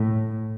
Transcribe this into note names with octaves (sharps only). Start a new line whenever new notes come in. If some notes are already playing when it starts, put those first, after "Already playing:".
Already playing: A2